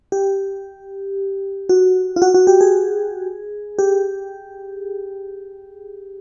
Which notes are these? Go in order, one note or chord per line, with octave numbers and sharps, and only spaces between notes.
G4
F#4
F4
F#4
F#4
G4
G#4
G4